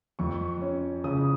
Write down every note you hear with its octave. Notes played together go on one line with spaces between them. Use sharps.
F2 C#6
C#4
C#3 D#6